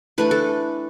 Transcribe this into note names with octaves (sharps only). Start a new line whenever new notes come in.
E3 A3 D4 B4
A4